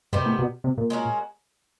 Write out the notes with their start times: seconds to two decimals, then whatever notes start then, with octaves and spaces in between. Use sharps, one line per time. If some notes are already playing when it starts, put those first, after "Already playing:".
0.13 G2 C3 D#3 G3 B3
0.26 A2
0.39 B2
0.64 C3
0.78 A#2
0.90 G#3 C#4 F#4 A#4